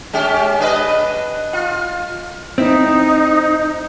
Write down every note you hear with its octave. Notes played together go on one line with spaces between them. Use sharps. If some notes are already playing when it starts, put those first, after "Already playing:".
G#3 C#4 G4
D4 B4 D#5
F4
C4 D#4 E4